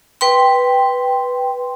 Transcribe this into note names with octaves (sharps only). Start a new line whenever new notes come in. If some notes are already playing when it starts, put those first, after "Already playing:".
B4 G5 C6